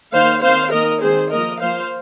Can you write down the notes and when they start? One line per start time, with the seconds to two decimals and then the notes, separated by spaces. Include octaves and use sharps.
0.12 D#3 A#3 C5 F5
0.42 D#3 C4 C5 F5
0.72 D#3 A#3 A#4 D#5
1.01 D#3 G#3 C4 G#4 C5
1.31 F3 A#3 A#4 D#5
1.60 F3 A#3 C5 F5